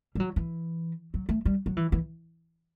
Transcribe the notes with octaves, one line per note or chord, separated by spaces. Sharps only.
G3
F#3
E3
F#3
A3
G3
F#3
E3
E3